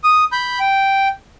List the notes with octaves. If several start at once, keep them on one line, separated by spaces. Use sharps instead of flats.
D#6
B5 G6
G5